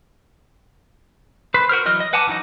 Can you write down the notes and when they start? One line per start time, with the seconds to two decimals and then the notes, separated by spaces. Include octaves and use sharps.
1.54 B4 C5
1.69 F#4 A#4 C5 F6
1.85 E3 F#3 D#5 F6
2.00 D#5
2.13 B4 F#5 G#5 A5 D6
2.27 E3 F#3 D#4 F#4 D#5